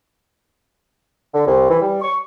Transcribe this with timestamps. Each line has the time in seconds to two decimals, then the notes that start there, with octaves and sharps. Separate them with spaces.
1.34 D3
1.47 C2
1.69 E3
1.81 G3
2.02 C#6